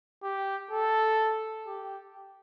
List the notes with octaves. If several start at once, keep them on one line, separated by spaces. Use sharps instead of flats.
G4
A4
G4